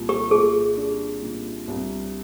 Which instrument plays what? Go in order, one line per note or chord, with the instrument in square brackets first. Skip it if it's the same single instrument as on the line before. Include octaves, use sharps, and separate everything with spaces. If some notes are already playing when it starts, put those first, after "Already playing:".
Already playing: [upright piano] C2 A#2
[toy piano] G4
[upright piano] A#2 [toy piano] G#4
[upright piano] D4
A#2
C2